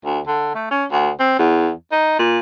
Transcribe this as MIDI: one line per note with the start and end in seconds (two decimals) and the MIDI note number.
0.05 0.20 38
0.27 0.53 50
0.55 0.69 57
0.71 0.85 61
0.91 1.10 38
1.19 1.39 60
1.39 1.71 40
1.92 2.17 63
2.19 2.39 46